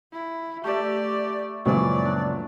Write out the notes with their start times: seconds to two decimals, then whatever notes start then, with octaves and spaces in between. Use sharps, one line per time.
0.12 E4
0.64 A3 G4 D5 E5
1.66 C#2 F#2 A#2 E3 F3 C#5 D5
2.05 D4